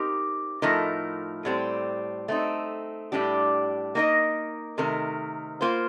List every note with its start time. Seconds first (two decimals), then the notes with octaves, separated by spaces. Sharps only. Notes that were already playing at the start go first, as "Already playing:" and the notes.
Already playing: C4 D#4 G4 A#4
0.62 A2 F3 A3 D#4 A#4
1.45 A2 G3 C4
2.28 A3 C4 D#4
3.12 A2 G3 D4 G4
3.95 A#3 D#4 A#4 D#5
4.78 C3 D#3 A3 D#4 A#4
5.61 A#3 F4 C5